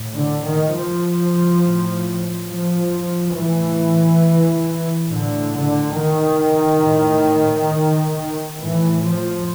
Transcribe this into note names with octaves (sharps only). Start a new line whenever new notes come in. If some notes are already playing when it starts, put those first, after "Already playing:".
Already playing: A2
D3
D#3
F3
A2
F3
A2 E3
A2 D3
D3
D#3
A2
A2 E3
F3